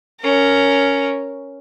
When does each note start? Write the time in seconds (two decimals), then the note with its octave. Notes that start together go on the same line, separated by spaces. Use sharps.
0.21 C#4 A#4